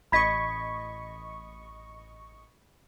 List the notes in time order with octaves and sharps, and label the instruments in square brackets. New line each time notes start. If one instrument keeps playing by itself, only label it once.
[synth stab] A1 D#5 C#6 [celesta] B5 G#6 B6